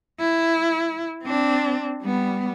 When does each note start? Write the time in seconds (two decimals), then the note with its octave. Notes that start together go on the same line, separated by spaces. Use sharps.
0.20 E4
1.24 C4 D4
2.03 G3 B3